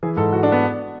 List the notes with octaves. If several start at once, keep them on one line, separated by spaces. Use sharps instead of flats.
E3 G#4
G#2 A4
E3 F#4
D4
B3